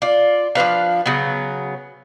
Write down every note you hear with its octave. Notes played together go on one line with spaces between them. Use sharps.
F4 D5
F3 D4 B4 F5
C#3 F#3 B3